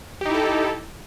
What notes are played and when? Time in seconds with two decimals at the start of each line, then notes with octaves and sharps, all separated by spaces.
0.21 G4
0.26 D#4
0.30 E4
0.34 A4